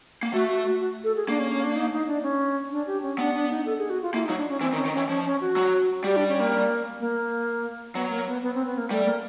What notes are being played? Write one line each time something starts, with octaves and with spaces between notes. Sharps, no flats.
A#3
A3 F#4
F#4
F#4
F#4
A4
G#4
A#3 D4
C#4
C#4
D4
D#4
D#4
D4
C#4
D4
G4
C#4
B3 D4
D4
D#4
A4
G#4
F#4
F4
A#3 E4
D#4
F#3
D4
C#4
E3 C4
D#3
C#4
D#3
E3 C#4
F3 C#4
C#4
F#4
F#3
G3 G4
D4
C#4
A#3
A#3
F#3 B3
A#3
B3
B3
C4
B3
A#3
G3 A3
A#3